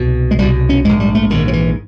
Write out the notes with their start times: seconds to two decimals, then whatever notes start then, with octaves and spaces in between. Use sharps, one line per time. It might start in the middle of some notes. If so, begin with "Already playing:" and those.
Already playing: C2 B2
0.31 G#3
0.39 C2 B2 G3
0.69 C#4
0.85 A#1 G#2 G#3
1.00 G3
1.15 A3
1.30 A#1 G#2 D#3
1.48 F3
1.53 E3